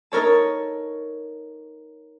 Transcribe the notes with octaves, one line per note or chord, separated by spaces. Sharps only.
D#4 A4 A#4 C#5 A5